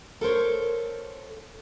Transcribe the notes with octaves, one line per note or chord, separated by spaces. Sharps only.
A4 A#4 C5 C#5